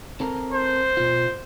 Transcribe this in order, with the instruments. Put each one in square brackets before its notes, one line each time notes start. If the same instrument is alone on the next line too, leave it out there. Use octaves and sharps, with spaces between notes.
[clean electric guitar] C4 A4 A#4
[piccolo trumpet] C5
[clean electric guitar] B2 F4